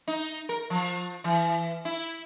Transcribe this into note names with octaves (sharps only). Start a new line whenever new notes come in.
D#4
A#4
F3
E3
E4